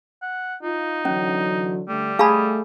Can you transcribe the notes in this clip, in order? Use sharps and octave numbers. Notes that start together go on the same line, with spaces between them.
F#5
D#4 F4
D3 E3 F#3 C#4
D3 G3 A3
A3 G#4 F5 A5 B5